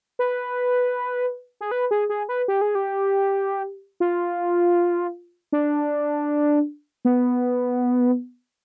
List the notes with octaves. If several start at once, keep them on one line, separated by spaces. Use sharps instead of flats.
B4
G#4
B4
G#4
G#4
B4
G4
G#4
G4
F4
D4
B3